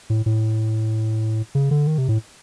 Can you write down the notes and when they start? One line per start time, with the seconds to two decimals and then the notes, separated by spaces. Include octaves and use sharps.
0.10 A2
0.26 A2
1.55 C#3
1.71 D3
1.87 D#3
1.98 C3
2.08 A2